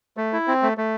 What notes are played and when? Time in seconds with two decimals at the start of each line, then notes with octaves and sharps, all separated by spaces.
0.17 A3
0.33 E4
0.48 C4
0.62 A3
0.78 A3